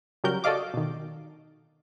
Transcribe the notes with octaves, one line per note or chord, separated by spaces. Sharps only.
C#3 F#3 G3 F#4 A#4 G6
F#4 A4 D5 D#5 F5 D6
B2 D#3